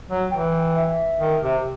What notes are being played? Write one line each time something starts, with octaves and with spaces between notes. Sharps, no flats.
F#3
E3 G5
E5
D#3
C3